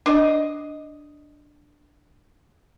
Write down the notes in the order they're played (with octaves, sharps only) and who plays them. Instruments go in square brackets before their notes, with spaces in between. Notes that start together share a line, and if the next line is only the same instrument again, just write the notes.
[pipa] D4 D#5